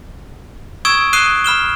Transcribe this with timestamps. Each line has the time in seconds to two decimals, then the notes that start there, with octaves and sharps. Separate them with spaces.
0.85 C#6 D#6 E6 G#6 D7 E7
1.13 D#6 F#6 C7 D#7 E7 G7
1.44 B5 F6 E7 G7